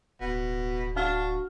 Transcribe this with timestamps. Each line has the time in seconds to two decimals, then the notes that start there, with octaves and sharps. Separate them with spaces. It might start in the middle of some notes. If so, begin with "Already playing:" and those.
0.21 D1 B2
0.96 D4 F#4 F5 F6